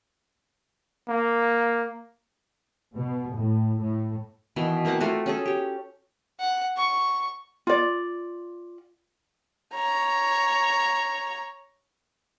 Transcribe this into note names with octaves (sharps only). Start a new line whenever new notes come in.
A#3
B2
A2
A2
B2 D#3 E3
E3 A#3 C4 F#5
A3 F4 F#4
C#4 G#4 A4
G4 C#5
F#5
C#6
F4 D5
C#5 A#5